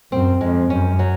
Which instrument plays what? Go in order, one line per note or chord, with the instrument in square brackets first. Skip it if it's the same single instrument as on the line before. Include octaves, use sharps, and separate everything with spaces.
[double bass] F#2 [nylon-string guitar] C4
[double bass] F2 [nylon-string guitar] G#3
[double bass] F#2 [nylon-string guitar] C#4
[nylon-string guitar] F#3